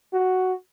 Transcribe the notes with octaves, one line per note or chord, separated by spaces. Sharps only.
F#4